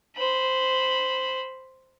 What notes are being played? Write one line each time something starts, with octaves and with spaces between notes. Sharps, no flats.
C5 B5